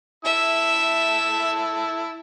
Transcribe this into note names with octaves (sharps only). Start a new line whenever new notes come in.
E4 E5 A5 E6